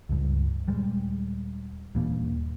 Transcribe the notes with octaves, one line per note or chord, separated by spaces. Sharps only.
C#2 G2
D#1 G3 G#3
D#1 G2 E3 A#3